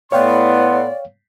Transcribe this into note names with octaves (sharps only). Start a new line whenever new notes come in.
A2 B3 C#5 D5 F5 G5 C6